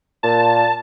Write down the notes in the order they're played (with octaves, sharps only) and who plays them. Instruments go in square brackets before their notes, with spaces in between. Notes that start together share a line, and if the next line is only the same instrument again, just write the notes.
[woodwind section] A#2 [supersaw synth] A5